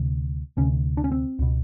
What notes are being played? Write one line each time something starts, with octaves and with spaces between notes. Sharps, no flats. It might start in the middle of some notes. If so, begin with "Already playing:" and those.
Already playing: D2 C3
D2 C3 C#4
D4
C#4
C4
C#2 B2